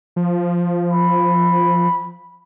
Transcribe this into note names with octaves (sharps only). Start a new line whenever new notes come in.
F3
B5